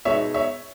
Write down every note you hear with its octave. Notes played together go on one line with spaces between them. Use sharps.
B2 G#3 B3 D#4 C#5 E5
C#5 E5